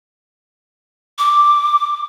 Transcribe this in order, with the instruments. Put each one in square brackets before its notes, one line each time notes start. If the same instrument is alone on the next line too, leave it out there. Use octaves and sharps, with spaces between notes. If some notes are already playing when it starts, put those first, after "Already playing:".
[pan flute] D6